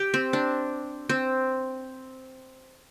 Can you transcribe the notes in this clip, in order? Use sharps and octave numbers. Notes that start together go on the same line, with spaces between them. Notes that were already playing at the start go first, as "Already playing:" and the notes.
Already playing: G4
C4
D4
C4